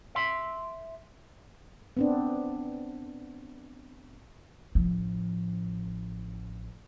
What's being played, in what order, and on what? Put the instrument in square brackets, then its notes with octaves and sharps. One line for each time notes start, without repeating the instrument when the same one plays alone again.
[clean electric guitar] E5 C6
[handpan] B3 C4 D4
[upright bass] A1 F3